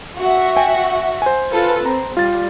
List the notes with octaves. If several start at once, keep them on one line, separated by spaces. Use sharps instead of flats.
F#4 E5
G5 G#5
C5 G#5
F4 A4 B4
C4 A#5
G3 F4 A6